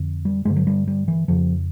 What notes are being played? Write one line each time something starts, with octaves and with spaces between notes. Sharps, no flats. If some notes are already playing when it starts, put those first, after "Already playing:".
Already playing: F2 D3
G3
G2 D3 G#3
F#3
G3
G3
E3
F2 C#3 F3